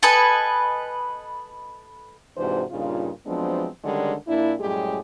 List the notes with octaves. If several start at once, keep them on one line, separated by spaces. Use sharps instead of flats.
A4 B4 D#5 G#5
G#2 C3 E3 D4 F#4 C5
G2 A#2 C#3 D#4 F4
F3 F#3 G#3 B3 C4 D4
D3 D#3 G3 G#3 C#4 D4
A#2 A#3 D4 E4
F#2 A2 G3 G#3 G4 G#4